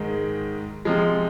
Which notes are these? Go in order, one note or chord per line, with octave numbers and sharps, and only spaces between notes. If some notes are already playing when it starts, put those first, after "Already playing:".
Already playing: G#2 D#3 G#3
C3 F3 G#3